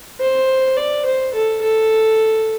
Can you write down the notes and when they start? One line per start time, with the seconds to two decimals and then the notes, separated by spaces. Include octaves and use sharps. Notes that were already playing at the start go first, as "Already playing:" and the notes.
0.21 C5
0.77 D5
1.06 C5
1.34 A4
1.62 A4